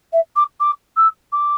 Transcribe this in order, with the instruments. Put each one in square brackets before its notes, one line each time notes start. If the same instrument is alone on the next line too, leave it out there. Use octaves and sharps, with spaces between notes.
[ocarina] E5
D6
D6
E6
D6